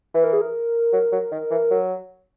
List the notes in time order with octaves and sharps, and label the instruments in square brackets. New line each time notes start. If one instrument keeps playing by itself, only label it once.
[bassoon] E3 [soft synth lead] B4
[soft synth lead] A#4
G#4
A#4
[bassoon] F#3
F#3
D#3
E3
F#3